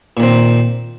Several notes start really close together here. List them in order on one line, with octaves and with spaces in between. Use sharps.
A#2 D#3 C4